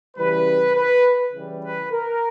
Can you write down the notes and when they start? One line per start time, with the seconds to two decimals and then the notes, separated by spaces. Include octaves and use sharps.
0.17 C#3 E3 G3 B4
0.75 B4
1.33 C#3 E3 G3
1.62 B4
1.92 A#4